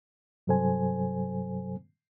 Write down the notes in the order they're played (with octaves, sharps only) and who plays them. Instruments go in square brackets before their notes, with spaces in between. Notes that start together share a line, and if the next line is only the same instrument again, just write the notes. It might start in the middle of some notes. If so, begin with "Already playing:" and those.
[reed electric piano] G2 C3 F#3 A4 C5 G#5